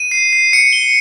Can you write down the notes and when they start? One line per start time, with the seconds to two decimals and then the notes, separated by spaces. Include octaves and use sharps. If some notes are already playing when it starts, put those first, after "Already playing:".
Already playing: D#7
0.11 C7
0.33 C7
0.53 C#7
0.73 G7